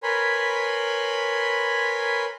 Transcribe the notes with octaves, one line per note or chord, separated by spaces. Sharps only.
A#4 B4 C#5 G#5 B5 C6